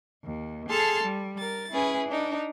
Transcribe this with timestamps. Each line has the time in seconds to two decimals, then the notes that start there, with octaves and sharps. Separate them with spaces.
0.24 D#2
0.69 G#4 A4 A5 C6 F6
1.03 G3
1.39 A#4 A6
1.71 C#4 E4 G#4 B4
2.08 D4 D#4